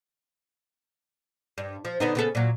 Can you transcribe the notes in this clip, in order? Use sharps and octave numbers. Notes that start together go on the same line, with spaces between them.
G2
F3
D3 B3 D#4
C#3 B3 A4
A#2 F#3